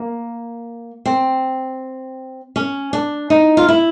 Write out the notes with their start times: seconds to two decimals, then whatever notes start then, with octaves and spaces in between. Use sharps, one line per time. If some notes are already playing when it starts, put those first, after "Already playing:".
Already playing: A#3
1.06 C4
2.56 C#4
2.93 D4
3.30 D#4
3.57 F4
3.68 E4